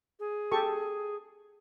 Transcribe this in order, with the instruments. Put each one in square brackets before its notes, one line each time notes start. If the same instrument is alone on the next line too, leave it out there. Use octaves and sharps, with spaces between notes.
[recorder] G#4
[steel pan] G4 A4 C#6